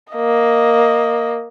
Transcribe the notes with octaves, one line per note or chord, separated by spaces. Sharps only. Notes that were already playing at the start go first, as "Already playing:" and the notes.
A#3 D#5